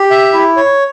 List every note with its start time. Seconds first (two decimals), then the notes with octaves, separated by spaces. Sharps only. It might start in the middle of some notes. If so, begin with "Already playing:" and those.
Already playing: G4
0.11 E5
0.33 E4
0.57 C#5